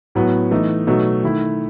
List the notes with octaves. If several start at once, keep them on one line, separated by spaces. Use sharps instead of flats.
A2 F#3 B3
E3 A3 D#4
B2 F#3 A3 D#4
D#3 A3 E4